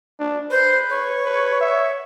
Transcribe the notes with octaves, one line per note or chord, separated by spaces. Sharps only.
D4
B4 C5
C#5
B4
E5